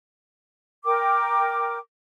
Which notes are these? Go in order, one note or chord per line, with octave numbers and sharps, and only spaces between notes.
A#4 G5 D6